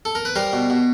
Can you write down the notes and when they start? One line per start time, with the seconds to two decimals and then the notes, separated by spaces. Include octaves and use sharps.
0.05 A4
0.15 A#4
0.25 B4
0.36 G3 A#4 C5
0.53 B2
0.70 B2